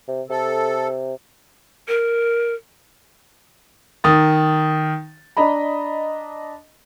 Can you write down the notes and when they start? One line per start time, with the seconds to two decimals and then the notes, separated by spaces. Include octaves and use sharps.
0.08 C3
0.30 C3 A4
1.88 A#4
4.04 D#3 D#6 A6
5.37 D4 D#5 A#5 B5